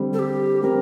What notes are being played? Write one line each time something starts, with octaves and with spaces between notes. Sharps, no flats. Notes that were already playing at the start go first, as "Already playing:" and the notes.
Already playing: D3 G3 C4
A4
G4
D3 G3 C4 A#4